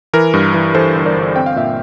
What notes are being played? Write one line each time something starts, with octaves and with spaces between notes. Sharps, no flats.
E3 A#4
G2
E3
E3 A4 C5
G1
A#4 D5
G1
C4 G5
F5
A#2 E5